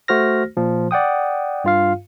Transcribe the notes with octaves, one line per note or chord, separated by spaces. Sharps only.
A3 F#4 C5 F6 A#6
A#2 F3
D5 F#5 G5 D#6
G2 F4 F5